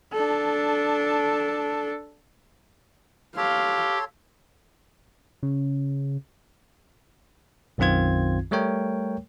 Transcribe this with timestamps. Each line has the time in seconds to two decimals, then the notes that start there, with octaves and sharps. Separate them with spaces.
0.13 D4 A4
3.37 G4 A4 C#5 F5 C6
5.43 C#3
7.78 B1 F#2 D#3 C4 F4 G#6
8.51 G3 A3 A#4 C#5 G5